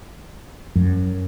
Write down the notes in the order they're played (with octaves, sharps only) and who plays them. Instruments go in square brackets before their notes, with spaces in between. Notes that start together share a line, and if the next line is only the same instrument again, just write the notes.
[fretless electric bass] F#2